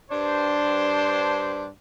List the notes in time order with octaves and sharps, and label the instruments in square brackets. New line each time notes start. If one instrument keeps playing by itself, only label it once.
[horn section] G2 D4 C5